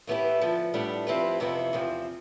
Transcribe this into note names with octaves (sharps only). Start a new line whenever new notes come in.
A2 E3 B3 E4 G4
D3 F3 B3
A2 G3 B3 D4
F3 C4 E4 G4 B4
F2 C3 E3 B3 E4
E2 C3 F3 C4